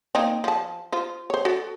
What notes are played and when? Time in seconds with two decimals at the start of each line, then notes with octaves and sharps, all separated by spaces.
0.15 A#3 C4 D#4
0.44 F3 A5
0.92 F4 C5
1.30 C5 C#5
1.45 F#4 A4